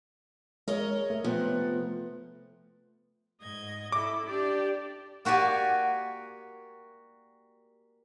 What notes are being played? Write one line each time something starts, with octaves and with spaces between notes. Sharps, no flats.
G#3 A#4 C#5 D#5
A3
C3 F3 B3
G#2 D#5 G#6
E4 A4 D6
D4 G4 D5
A#3 F#4 G4 D5 G#5